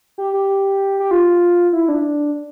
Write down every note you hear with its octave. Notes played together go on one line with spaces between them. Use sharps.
G4
G4
G4
F4
E4
D4